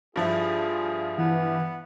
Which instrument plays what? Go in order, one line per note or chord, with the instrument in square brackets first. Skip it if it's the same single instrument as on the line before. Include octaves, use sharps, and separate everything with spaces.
[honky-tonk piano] G2 F3 E4 [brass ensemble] F4 G#4
[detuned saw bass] E3 [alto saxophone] B3